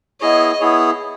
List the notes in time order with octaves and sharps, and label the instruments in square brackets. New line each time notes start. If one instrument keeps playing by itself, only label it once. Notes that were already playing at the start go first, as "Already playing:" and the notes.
[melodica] B3 E4 G#4 C#5 [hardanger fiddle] D#5
[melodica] B3 E4 G#4 C#5